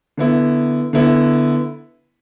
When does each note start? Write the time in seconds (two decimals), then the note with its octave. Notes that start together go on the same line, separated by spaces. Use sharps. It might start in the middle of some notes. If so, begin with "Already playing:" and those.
0.17 D3 B3 E4
0.93 D3 B3 E4